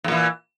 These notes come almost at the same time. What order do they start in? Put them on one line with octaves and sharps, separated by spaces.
E2 A#2 E3